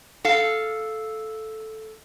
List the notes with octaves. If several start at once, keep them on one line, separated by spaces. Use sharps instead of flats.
A4 F5